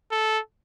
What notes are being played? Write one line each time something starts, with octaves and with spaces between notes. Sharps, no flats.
A4